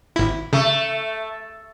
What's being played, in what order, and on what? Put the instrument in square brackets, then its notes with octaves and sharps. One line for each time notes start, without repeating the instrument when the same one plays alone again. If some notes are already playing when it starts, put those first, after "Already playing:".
[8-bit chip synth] G#1 E4
[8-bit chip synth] C#3 [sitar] A3